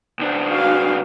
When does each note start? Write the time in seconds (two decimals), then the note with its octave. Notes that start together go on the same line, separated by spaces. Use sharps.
0.19 C#2 D4
0.49 F#4 F5